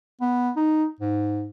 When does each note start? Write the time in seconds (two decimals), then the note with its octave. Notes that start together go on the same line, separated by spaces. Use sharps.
0.21 B3
0.56 D#4
1.00 G#2